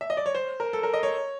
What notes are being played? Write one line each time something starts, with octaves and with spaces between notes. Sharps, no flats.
E5
D#5
D5
C#5
C5
A#4
A4
A#4
D#5
C#5